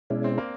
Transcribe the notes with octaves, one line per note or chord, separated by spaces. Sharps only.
B2 G#3 C#4 D4 E4
C4
A#3